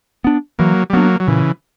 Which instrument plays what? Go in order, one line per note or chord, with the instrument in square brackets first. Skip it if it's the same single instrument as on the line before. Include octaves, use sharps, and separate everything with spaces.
[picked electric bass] B3 D4
[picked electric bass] E3 [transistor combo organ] F#3 A#3
[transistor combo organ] G3
[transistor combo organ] F#3 A#3 [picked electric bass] B3 D4
[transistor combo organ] F#3
[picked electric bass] A#2 [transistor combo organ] C#3 E3